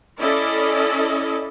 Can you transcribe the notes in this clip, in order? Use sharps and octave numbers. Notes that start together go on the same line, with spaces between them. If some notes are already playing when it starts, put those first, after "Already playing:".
C#4 E4 A4 D5 D#5